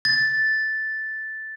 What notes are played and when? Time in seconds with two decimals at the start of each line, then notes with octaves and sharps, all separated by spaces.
0.05 A6